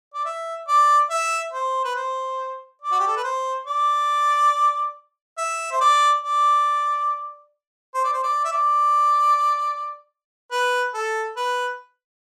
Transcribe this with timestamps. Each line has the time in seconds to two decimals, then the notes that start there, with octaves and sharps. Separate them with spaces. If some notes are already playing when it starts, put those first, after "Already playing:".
0.14 D5
0.25 E5
0.68 D5
1.10 E5
1.53 C5
1.84 B4
1.96 C5
2.82 D5
2.92 F#4
3.00 G4
3.07 A4
3.16 B4
3.24 C5
3.67 D5
5.38 E5
5.72 C5
5.81 D5
6.24 D5
7.95 C5
8.04 D5
8.13 C5
8.23 D5
8.45 E5
8.52 D5
10.51 B4
10.94 A4
11.37 B4